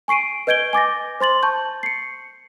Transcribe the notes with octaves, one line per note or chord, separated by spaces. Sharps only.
G#5 C#6 C7 D7 D#7
B4 D#5 G6 G#6 D7 G7
G#5 D6 A6 A#6
C5 C6 A6 F#7
A5 C#6 G6
C7 C#7